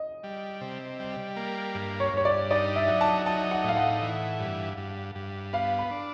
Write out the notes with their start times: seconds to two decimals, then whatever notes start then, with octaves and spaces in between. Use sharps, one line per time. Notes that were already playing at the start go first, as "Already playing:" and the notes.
Already playing: D#5
0.23 G3
0.61 C3
0.99 G3
1.37 A#3
1.75 G2
2.00 C#5
2.13 G2 C#5
2.25 D5
2.50 D#4 D5
2.76 E5
2.88 F#3
3.01 A5
3.26 D#4 A5
3.51 F#5
3.64 A2 F5
3.76 F#5
4.02 E3
4.40 G2
4.77 G2
5.15 G2
5.53 B3 F5
5.78 B5
5.91 D4